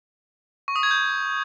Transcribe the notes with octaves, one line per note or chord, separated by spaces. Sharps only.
C#6
D#6
G#6
G6